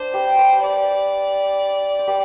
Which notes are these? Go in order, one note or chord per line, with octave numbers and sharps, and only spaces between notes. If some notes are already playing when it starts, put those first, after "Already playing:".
Already playing: D4 C5
G4 B4
G4 B4
D5
C5
G4 B4